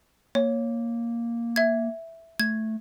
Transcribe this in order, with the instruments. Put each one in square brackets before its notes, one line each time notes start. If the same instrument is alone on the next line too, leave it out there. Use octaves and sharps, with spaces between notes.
[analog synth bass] A#3 [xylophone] C#5
[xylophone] E5 G#6
[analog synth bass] A3 [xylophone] G#6